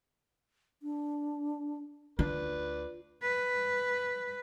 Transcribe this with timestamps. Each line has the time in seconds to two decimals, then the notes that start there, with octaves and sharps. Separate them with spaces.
0.83 D4
2.19 D2 D3 D4 F4 B4 D5
3.22 B4